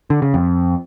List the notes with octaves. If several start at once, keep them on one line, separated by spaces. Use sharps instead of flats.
D3
C#3
F2